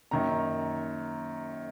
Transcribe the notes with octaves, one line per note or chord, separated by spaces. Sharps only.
F#2 D#3 A#3 A#5